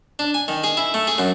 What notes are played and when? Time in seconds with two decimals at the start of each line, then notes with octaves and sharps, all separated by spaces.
0.19 D4
0.34 G#5
0.48 D#3
0.64 G#4
0.77 E4
0.94 A3
1.07 G#4
1.18 F#2